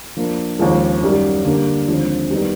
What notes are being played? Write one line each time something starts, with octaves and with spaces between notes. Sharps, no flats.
F3 A#3 D4
D#2 C#3 F3 G#3
F#2 D#3 G3
D3 G3 A#3
D#2 D3 F3 G#3 C4
D#3 G3 B3 D#4